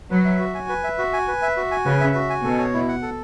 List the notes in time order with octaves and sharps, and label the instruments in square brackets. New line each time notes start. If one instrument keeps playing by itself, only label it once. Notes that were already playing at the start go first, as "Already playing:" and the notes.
[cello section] F#3 [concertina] B4
[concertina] E5
F#4
G#5
B4
E5
F#4
G#5
B4
E5
F#4
G#5
[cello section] C#3 [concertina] B4
[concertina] E5
F#4
G#5
[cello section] B2 [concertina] A4
[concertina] C#5
E4
F#5
A4